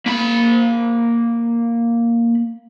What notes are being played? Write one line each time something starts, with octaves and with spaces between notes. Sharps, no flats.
A#3 B5